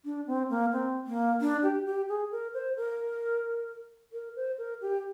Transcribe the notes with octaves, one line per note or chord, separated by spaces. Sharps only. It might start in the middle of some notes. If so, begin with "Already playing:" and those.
D4
C4
A#3
C4
A#3
D4
G4
G4
G#4
A#4
C5
A#4
A#4
C5
A#4
G4